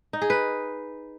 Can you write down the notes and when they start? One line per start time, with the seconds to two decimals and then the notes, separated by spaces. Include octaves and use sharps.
0.13 D#4
0.22 G#4
0.30 B4